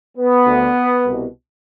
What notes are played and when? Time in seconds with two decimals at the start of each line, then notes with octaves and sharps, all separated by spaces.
0.17 B3
0.46 D2 D3
1.05 C2 B2